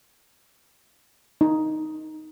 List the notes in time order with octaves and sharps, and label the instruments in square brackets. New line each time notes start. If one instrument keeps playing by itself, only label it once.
[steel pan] D#4